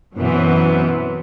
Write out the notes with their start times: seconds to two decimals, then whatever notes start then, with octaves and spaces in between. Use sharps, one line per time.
0.17 F#2 B2 E3 F#3 B3 C4